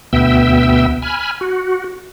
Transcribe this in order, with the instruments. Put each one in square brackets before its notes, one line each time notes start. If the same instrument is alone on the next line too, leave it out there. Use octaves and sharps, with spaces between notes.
[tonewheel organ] D2 B2 B3 E5 G5 E6
G#5 B5 F6
F#4